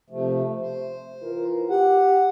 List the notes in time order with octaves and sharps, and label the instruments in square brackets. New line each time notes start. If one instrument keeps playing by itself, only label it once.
[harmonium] C3 F3 A3
C5
[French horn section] E3 F4 A#4
[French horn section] G4 [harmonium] F#5